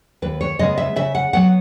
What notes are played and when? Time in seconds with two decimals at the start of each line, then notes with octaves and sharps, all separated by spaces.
0.22 D#2 B4
0.41 C#5
0.59 C#3 G#3 B3 D#5
0.78 E5
0.96 C#3 E5
1.15 F#5
1.33 F#3 B3 F#5